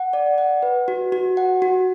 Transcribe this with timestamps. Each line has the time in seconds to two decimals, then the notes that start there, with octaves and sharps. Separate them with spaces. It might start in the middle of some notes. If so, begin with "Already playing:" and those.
Already playing: F#5
0.13 D5
0.38 F#5
0.63 B4
0.88 F#4
1.12 F#4
1.37 F#5
1.62 F#4